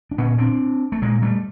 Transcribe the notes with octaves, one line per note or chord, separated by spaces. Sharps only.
D4
A#2 B3 C#4
C4 D4
A3
A#2 G#3 A#3
G3 A3